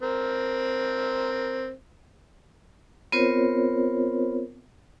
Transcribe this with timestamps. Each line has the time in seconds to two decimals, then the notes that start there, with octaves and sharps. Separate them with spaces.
0.02 C4 A#4
3.12 B3 C4 F4 A#4 C5 C#5